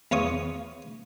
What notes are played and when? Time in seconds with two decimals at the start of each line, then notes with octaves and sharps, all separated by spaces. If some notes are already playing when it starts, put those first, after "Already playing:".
0.11 E2 F4 C#5 D#6